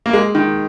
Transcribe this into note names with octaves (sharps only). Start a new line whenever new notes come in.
A#3
G#3
D#3